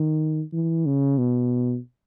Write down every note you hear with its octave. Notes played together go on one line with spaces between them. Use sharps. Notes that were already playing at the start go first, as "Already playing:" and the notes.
Already playing: D#3
E3
C#3
B2